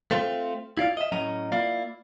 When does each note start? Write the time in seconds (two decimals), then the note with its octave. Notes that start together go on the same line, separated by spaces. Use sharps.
0.11 A3 C4 F4
0.77 E4 F4 D5 F5
0.97 D#5 E5
1.12 A2 F#3 C#4 D#5 A#5
1.52 A#3 E4 F4 D5 F5